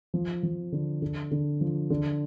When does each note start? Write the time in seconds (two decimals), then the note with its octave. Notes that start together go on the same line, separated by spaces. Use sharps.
0.14 F3
0.43 F3
0.72 D3
1.02 D3
1.31 D3
1.61 F3
1.90 D3